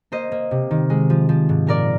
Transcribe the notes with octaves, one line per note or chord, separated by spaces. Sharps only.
A#3 C5 D#5
A#3
C3
D#3
G#3
F3
F3
G#2
A#2 A#4 D5